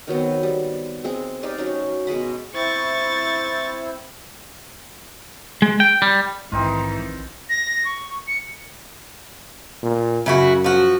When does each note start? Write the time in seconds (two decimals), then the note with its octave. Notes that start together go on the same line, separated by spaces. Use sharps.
0.07 D#3 F#3 B3 C4
0.43 G3
1.04 G#3 C4 G#4
1.43 D#4 G4 D5 F5
1.58 F#3 C#4 D#4
2.07 B2 G#3 D#5 B5
2.54 C4 E4 C5 C#6 A6
5.62 G#3
5.80 G5
6.02 G3
6.52 A#1 G#2 D#3 E3 C4 D#4 F4
7.49 A#6
7.85 C#6
8.27 C#7
9.83 A#2
10.26 F#2 C#3 E4 F#4
10.64 F3 F#4